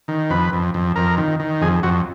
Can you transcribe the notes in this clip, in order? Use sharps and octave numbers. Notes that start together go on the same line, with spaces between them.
D#3
F2 B4
F2
F2
F2 A#4
D#3
D#3
F2 G#4
F2 F#4